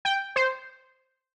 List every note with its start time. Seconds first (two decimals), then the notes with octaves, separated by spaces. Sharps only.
0.05 G5
0.36 C5